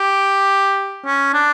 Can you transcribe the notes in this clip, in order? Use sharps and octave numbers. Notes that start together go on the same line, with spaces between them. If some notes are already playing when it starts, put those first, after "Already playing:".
Already playing: G4
C#4
D4